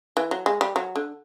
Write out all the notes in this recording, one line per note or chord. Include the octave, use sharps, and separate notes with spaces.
E3
F#3
G#3
G3
F#3
D3